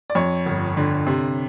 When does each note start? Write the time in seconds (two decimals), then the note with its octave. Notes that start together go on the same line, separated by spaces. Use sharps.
0.10 D5
0.15 F2 C#5
0.46 G1
0.77 D3
1.06 C3